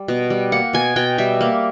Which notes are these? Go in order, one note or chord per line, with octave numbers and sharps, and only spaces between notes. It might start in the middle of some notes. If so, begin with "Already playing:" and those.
Already playing: G3
B2
G3
A#3 F#5
B2 G#5
B2 G5
G3 E5
A#3